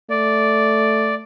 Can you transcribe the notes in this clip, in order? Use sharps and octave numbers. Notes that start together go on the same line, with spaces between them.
A3 D5